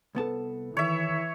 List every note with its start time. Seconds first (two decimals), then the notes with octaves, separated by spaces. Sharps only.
0.15 C2 B3 A4 B4 A5
0.77 D#3 E3 C#5 E5